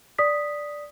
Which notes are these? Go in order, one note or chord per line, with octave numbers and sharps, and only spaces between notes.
D5 D#6 B6